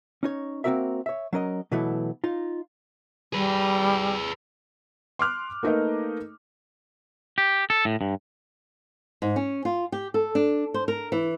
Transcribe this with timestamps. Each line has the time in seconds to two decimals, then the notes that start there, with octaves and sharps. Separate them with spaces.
0.23 C#4 D#4 C#5
0.64 A#3 C4 D4 F#4 A#4 E5
1.06 C#5 E5
1.33 F#3 C#4 A#4 D#5
1.71 B2 E3 F#3 A3 B3 E4
2.24 D#4 F4
3.33 G3 G#4 B4
5.19 C6 D6 F6 F#6
5.63 A3 A#3 D#4 A#4 B4 D#5
7.38 G4
7.70 A4
7.85 A2
8.01 G2
9.22 G#2
9.36 C#4
9.65 F4
9.92 G4
10.14 A4
10.35 D4
10.74 C5
10.88 A#4
11.12 E3